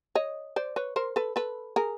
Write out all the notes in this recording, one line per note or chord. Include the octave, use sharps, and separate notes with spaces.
C#5 D#5
C5 D5
B4 C#5
A#4 C5
A4 B4
A4 B4
G#4 A#4